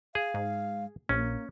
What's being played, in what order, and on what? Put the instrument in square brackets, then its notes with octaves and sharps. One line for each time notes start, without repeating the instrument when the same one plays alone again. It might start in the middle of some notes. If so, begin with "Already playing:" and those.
[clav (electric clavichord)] G#4 [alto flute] F5
[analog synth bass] G#2
[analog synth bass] A#1 [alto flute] A#3 [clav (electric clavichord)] C#4